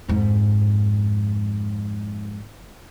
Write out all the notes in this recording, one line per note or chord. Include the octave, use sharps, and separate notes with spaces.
F2 G#2